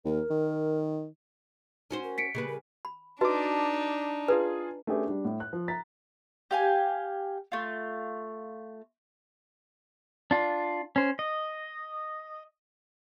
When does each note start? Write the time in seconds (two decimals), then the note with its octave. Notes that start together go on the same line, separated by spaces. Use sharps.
0.05 D#2 A#4
0.30 D#3
1.91 C#4 D#4 F#4 C5
2.03 A#4
2.18 B6 C#7 D7
2.35 C#3 G3 A#3 B4
2.48 A#4
2.85 B5
3.21 D4 D#4 F#4 B4 D#5 A5 D6
4.28 F4 G#4 B4 G#5
4.87 A3 C#4 D4 G4 G#4 B4
5.07 G3 D4
5.25 A2
5.40 F#6
5.53 F3
5.68 A#5 A6 B6
6.51 G4 F5 G#5
7.52 A3 F4
10.31 D4 F4
10.96 C#4 C5
11.19 D#5